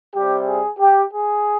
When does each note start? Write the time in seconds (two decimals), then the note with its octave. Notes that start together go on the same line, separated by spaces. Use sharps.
0.14 C3 G3 G4
0.47 G#4
0.79 G4
1.12 G#4